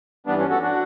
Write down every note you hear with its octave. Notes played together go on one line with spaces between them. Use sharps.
G2 E3 G3 B3 D4
C#4
F#4 A4
D4 F#4